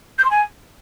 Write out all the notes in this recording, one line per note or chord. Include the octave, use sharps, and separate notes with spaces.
G6
C6
G#5